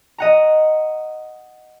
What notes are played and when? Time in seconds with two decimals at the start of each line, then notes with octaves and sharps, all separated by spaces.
0.18 D#5 F#5 A#5